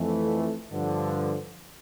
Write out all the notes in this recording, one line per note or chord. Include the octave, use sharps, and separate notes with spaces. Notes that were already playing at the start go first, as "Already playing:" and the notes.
Already playing: F2 E3 A3
G2 D3 F3